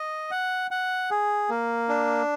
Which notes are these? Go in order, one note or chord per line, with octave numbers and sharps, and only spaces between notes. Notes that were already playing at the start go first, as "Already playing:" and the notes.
Already playing: D#5
F#5
F#5
G#4
A#3
D4